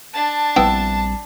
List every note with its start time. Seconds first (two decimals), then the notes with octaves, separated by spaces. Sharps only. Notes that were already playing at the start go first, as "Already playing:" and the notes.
0.13 D4 A5
0.56 A#1 G3 B3 C4 E4 G5